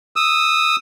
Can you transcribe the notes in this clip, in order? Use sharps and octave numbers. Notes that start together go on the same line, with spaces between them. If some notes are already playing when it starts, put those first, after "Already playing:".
D#6 E6